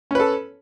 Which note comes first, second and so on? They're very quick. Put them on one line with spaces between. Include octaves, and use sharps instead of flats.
C#4 B4 A4